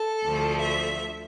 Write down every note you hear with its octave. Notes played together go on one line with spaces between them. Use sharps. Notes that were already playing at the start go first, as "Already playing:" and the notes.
Already playing: A4
D2 D3 F3 A3
E5